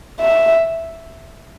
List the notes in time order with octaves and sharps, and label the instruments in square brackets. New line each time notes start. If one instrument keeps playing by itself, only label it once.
[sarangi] E5